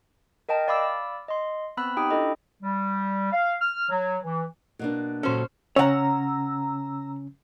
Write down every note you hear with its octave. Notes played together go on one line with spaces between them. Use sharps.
A#4 D#5 G5 A5
D5 F5 B5 D6 E6
D#5 C6
B3 C4 B5 E6 F#6
D#4 G4 G5 B5 D#6
D4 E4 A4 D#5
G3
F5
F6
F#3
E3
B2 A#3 D4
A#2 C#4 F#4 A4 C5
C#3 C#4 C#5 F#5 A#5 E6